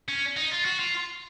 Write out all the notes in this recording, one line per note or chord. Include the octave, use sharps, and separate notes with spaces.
C#4
D#4
F4
F#4
F4